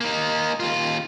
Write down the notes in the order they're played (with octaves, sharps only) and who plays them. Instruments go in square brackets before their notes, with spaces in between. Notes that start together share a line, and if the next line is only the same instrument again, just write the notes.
[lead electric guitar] A#3 D#4
D#2 F4